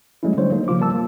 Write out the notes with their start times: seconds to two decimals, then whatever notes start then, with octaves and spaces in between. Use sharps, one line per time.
0.23 F#3 G#3 A3 C#4 E4
0.37 D3 G3 C5 C#5
0.50 F#3 A#3 D#4
0.68 C#3 F3 F#3 F4 D6
0.80 G3 A#3 A5 E6
0.93 A#3